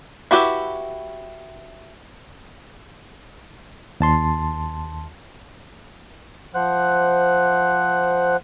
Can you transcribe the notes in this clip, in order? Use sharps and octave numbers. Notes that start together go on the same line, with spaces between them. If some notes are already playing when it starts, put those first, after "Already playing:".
E4 F#4 G4 B4 E5
D#2 A5 C6
F3 C5 F#5 F#6